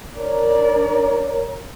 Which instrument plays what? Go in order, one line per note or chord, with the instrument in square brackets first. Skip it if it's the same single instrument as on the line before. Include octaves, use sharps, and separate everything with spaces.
[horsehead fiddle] D4 D5 [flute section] A#4 C#5 A#5